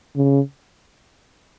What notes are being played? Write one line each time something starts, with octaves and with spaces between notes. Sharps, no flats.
C#3